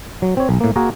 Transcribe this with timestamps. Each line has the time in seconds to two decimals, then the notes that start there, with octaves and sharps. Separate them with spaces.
0.22 F#3
0.37 C4 C#5
0.49 B1
0.60 A2 A#3
0.76 A#3 F#4 G#4 A#4